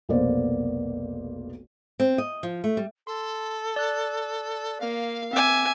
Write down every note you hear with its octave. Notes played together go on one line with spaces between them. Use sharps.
F1 B1 A#3 B3 C5 D5
C4
D#5
F3
A3
G3
A4 C6
D5 F#6
A#3 F5
C4 E5 G#5 D6